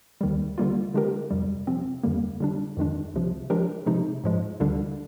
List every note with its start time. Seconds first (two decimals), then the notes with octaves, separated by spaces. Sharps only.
0.21 D#2 D#3 G3
0.58 D3 G3 A#3 F4
0.94 D3 G#3 D4 G4 A#4
1.31 F2 C3 G3
1.67 C3 F3 C4
2.03 F2 D3 G3 A#3
2.40 D3 G3 D4
2.77 F2 D#3 G#3 D4
3.14 C2 C3 F3
3.50 F3 G#3 D4 G4 A#4
3.86 C3 F3 G#3 D#4
4.24 G#2 F3 G#3
4.60 D2 D3 G3 D4